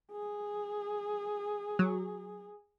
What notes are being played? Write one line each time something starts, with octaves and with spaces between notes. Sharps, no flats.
G#4
F#3